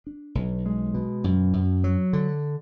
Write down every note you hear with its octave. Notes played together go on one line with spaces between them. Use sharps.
D4
B1
G#3
B2
F#2
F#2
F#3
D3